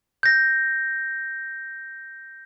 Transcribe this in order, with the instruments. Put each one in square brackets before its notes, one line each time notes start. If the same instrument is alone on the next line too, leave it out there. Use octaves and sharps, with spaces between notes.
[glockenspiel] G6 A#6